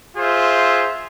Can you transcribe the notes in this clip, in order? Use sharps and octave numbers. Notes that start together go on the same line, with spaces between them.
F4 G#4 C5 E5